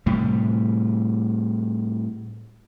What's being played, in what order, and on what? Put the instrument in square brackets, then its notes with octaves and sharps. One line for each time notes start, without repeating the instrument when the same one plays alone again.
[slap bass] A2 C3 G3